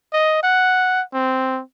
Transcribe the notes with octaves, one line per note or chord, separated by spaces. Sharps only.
D#5
F#5
C4